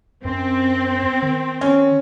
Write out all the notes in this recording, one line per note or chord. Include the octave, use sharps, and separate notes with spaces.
F#2 C4
D#3
C#4